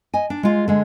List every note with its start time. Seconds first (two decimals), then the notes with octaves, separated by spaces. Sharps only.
0.14 D#5 G#5
0.30 D4
0.43 G#3 F4
0.68 D3 G#3